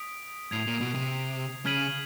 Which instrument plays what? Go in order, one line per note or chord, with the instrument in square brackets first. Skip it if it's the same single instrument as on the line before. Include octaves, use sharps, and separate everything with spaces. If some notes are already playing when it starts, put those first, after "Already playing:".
Already playing: [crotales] D#6 B6 D7
[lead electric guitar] A2 [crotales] G#6 C7 F7
[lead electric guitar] A#2
B2
C3
[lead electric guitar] C#3 [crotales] F6 G#6 B6 D#7 F#7